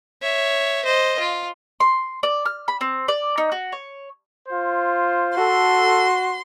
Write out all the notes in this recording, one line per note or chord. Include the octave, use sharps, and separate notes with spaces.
C#5 E5
C5 D#5
F4
C6
D5
F6
B5
C4
D5
D#4
F#4
C#5
F4 C5
F#4 A4 C6